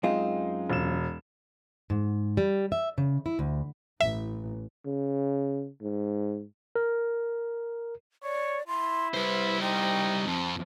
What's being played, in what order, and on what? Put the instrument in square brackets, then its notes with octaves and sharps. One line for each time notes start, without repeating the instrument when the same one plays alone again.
[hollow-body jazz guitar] F#2 C4 F4 [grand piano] G#3 D#4
[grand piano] E1 E7
[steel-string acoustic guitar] G#2
G3
E5
C#3
E4
D2
[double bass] A1 [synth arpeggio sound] E5
[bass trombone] C#3
G#2
[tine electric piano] A#4
[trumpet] C#5 [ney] D5
[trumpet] E4 [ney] C6
[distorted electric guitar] G3 C5 [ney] B4
[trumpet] D#4 [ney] G5
[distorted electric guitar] F2 [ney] A5